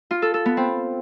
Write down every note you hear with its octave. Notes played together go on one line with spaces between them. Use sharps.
F4
A4
A4
B3
C4